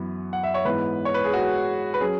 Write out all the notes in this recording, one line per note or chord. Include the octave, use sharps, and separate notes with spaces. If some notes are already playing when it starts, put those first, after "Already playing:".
Already playing: F#2 E3 B3
F#5
E5
C#5
G#2 E3 B3 B4
C#5
B4
G#4
F#4
B4
F#3 C#4 G#4